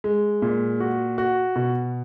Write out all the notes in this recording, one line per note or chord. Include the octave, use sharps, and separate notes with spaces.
G#3
A#2
F#4
F#4
B2